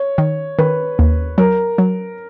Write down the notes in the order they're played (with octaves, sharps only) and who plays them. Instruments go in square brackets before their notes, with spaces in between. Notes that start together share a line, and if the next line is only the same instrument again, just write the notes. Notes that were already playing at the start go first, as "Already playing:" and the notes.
Already playing: [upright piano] C#5
[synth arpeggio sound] D#3
[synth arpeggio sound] D#3 [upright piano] B4
[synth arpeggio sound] D#2
[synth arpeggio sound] F#3 [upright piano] A#4
[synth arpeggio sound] F#3